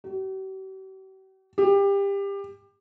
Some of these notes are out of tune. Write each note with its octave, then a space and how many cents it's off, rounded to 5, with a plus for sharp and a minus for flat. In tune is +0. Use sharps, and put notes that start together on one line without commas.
G4 -45
G4 +25